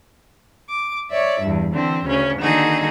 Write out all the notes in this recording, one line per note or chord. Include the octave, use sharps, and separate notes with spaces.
D6
C#5 D5 E5
E2 G2
D3 E3 C4
D2 C#3 C#4
D3 D#3 A#3 D#4 F#4 G#4